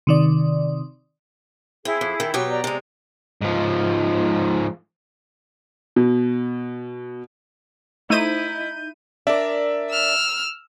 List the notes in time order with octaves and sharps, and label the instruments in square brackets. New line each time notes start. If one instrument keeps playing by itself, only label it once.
[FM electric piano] C3 D#3 D5
[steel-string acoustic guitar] C4 [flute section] E4 G#4
[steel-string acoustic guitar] F2
D#3
[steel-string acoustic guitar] B2 F#3 G4 [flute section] B4
[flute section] D5 A#5
[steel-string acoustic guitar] C3 G#3
[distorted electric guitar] G#2 F3
[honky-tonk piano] B2
[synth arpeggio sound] A3 C5 [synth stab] D#4 D#7 [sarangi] E4 [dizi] G6
[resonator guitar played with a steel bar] D4 A#4 [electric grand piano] D5 E5
[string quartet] E6 F6